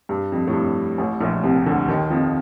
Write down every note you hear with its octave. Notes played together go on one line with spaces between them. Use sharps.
G2
F2
A2
G2
A1 A2
A#1 A#2
C2 C3
D2 D3
D#2 D#3
F2 F3